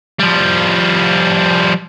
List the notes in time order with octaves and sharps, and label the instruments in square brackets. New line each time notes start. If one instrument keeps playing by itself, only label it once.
[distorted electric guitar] F3 G3